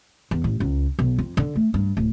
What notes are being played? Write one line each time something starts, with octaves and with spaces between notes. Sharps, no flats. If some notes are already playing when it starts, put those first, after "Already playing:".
E2
A1
C#2
B1
F2
D3
A3
G2
D1